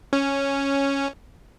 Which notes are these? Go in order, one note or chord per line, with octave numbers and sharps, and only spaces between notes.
C#4